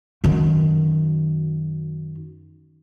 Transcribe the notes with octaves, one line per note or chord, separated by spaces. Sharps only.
F#2 D#3